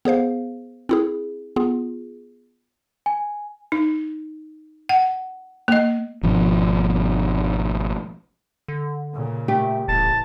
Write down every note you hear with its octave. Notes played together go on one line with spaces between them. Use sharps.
B3 G#4 C5 F5
C4 E4 G#4
B3 F4 G#4
G#5
D#4
F#5
A#3 D#5
G#1 B2 F3
D3
A#2 C#3
A3 G4
D#1 A1 A5